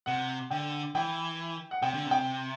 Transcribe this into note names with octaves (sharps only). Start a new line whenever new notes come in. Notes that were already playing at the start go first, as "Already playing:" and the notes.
C3 F#5
D3 G5
E3 G5
F#5
C3 G5
D3
C3
G5